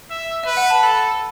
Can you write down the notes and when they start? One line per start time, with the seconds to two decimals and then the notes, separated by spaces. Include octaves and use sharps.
0.11 E5
0.43 B4 E5
0.57 F#5
0.70 A5
0.83 A4 B5